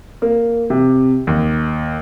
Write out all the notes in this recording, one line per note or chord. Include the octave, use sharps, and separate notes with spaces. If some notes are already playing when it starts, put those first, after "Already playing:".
A#3
C3
D#2